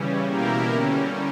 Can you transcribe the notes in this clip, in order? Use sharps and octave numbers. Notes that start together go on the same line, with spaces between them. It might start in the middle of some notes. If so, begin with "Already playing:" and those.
Already playing: C#3 E3 G3 C#4
B2 A#3 E4 G4 A#4
D3 G3 C#4